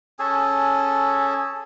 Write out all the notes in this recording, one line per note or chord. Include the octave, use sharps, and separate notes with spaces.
C#4 G#4 A4